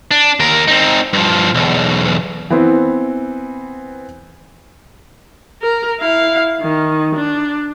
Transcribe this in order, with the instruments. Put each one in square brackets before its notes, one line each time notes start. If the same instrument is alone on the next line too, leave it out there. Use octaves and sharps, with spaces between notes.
[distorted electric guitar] D4
D#2 A#4
C4 D#4
G2 F3
B1 E2
[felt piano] E3 B3 C4
[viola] A#4
E4 F5
D#3
D4